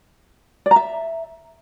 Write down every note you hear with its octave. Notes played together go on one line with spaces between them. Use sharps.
D5
A#5
E5